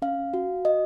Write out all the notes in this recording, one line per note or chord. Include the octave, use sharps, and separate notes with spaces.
C#4 F5
F#4
F#4 D#5